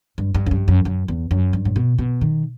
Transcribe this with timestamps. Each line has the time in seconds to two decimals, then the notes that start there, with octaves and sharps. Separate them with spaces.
0.18 G2
0.34 G2
0.46 F#2
0.51 G2
0.68 F#2
0.85 F#2
1.08 E2
1.31 F#2
1.53 G2
1.65 A2
1.76 B2
1.98 B2
2.21 D#3